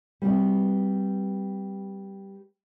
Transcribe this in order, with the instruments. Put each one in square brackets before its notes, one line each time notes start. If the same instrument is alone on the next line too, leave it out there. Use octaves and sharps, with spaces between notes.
[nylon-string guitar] G3 B3 C4 F#4